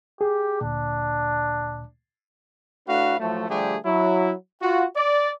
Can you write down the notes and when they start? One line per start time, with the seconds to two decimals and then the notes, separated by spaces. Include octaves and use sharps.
0.21 G4 G#4
0.61 D2 A#2 D4
2.88 A2 A3 D4 F#4 B4 F5
3.20 A2 F3 F#3 A3
3.49 D3 F3 G3 A3 G4 G#4
3.86 F#3 E4
4.62 F4 F#4
4.96 D5